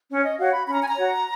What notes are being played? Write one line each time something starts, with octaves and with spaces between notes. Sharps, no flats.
C#4 C#5
D#5
F#4 C#5 F5
B5
C#4 B5
A#5
G#5
A#5
F#4 C#5